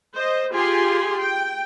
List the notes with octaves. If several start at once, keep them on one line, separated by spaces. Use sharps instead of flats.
C5 D#5
F4 G4 G#4 G#5 C6
G5